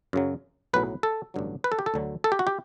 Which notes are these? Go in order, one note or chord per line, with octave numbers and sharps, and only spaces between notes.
F#2 C#3 F#3
B1 A2 F#3 B4
A4
A1 G2 D3 F#3
B4
A4
G4
A4
D2 D3 F#3
A4
G4
F#4
G4